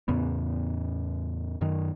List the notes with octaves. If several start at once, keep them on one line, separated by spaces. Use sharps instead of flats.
E2 A2 C#3 B3
F#2 D#3